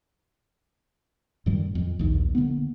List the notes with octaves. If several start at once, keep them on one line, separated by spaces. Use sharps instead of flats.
F#2 A2 D#3 G3
F2
A#1 D#2 D#3
D3 A#3 B3